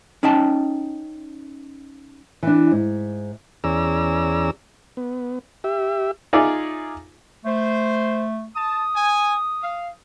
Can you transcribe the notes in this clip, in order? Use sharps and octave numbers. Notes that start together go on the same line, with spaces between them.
C#4 D#4 G5 A5
E3 D4
G#2
E2 C#4 G#4 D5 A#5 E6
B3
G4 E5
D#4 F4 G#4 D5 E5
A3 C5
A5 D#6
G#5
F5